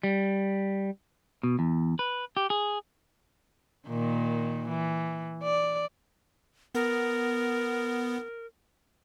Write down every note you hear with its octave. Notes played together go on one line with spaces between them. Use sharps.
G3
B2
E2
B4
G4
G#4
A#2 D#3
E3
D5
B3 A#4